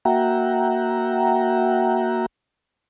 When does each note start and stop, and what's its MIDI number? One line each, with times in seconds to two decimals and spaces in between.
0.05 2.26 58
0.05 2.26 66
0.05 2.26 76
0.05 2.26 78
0.05 2.26 79
0.05 2.26 82